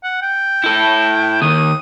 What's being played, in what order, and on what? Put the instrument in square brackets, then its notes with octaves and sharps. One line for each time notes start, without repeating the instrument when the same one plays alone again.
[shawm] F#5
G5
[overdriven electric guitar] E4 A4
[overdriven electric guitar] D#2 D#3 [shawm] D#6